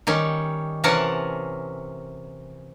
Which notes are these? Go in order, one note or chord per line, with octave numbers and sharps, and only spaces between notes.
D#3 G3 C#4
C3 E3 C#4 A#4 F#5 A5